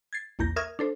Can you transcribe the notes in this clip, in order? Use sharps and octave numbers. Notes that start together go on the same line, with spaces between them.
G#6 A6 C7
A#1 E2 A#3 G6 A#6
A#4 E5 C#6 D#6 F6 G#6
D4 A4 C5